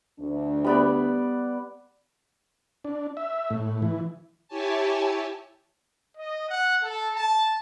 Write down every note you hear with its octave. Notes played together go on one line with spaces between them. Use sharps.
D2 D4
G3 B3 D5
D4
E5
A2
E3
E4 G4 C#5 G#5 A5
D#5
F#5
A4
A5